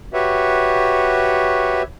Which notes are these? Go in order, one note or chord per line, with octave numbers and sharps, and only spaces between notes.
F#4 G4 B4 C#5 E5